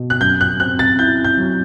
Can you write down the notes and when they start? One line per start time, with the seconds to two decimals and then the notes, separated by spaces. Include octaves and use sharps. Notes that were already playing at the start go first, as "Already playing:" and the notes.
Already playing: B2
0.10 F#6
0.21 F#2 G6
0.41 F#6
0.60 C4 F#6
0.79 A6
0.99 E4 G6
1.24 G6
1.37 F#3